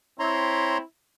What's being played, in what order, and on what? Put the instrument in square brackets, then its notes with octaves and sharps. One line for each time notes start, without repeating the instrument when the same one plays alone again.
[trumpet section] C4 E4 [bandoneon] C#5 A#5 C6